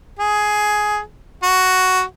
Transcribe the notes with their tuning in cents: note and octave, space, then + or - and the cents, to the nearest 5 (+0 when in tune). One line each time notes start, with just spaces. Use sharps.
G#4 +10
F#4 +5